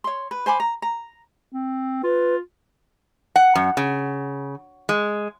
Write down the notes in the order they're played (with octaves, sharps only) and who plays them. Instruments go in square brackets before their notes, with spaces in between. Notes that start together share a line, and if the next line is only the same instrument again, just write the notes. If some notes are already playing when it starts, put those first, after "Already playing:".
[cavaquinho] C#5 C6
B4
C5 G#5 B5 D6
A#5
A#5
[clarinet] C4
[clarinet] F4 [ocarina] B4
[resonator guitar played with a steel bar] F#5
F#2
C#3
G#3